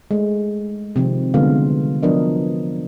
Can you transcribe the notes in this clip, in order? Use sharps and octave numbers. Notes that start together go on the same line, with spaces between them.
G#3 A3
C3 D#3 F3 C4
D3 G3 G#3 B3 F4 F5
F3 F#3 B3 D4 A#4 D#5